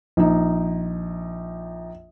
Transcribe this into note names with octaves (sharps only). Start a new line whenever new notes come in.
A#1 D#4